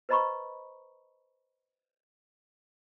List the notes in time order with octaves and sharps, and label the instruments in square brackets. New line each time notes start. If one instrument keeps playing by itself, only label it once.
[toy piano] B4 C5 D#5 A#5 B5 C#6